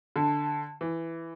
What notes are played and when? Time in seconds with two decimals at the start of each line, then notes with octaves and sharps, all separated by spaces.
0.16 D3 A5
0.81 E3